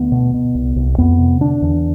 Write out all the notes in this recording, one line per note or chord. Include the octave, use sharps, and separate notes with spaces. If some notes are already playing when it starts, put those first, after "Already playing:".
Already playing: D2 B3
B2
B2
C2
C2
F2 B3
C3
D3 D4
E2